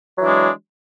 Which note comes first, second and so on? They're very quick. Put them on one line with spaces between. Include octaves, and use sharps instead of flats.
F#3 E3 D4 G#3